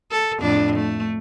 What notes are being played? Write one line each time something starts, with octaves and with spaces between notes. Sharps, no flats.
A4
F2 A2 D4
A3